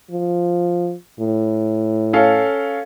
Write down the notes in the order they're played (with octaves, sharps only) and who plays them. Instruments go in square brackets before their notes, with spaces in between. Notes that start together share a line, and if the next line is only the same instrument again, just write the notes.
[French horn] F3
A2
[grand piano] C#4 A4 F5